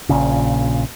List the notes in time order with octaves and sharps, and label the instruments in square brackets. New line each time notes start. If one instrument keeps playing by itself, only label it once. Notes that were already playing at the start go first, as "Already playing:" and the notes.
[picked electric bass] A#1 A#2 C#3